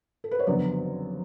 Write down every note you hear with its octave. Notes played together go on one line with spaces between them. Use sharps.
A4
B4
C#5
F#1 F2 D3 F#3 B3 D5